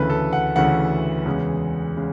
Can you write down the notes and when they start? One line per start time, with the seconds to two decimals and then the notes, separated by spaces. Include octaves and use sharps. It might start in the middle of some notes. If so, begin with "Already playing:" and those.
Already playing: D2 C#3 E3 A3 B4
0.10 A4
0.33 F#5
0.56 D2 C#3 E3 A3 F#5
1.26 E2 C#3 G#3
1.96 C#3 G#3